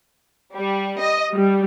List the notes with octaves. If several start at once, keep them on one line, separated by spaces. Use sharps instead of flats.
G3
D#5
G3